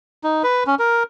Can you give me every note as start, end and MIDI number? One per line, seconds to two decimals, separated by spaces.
0.24 0.43 63
0.43 0.64 71
0.67 0.75 61
0.79 1.03 70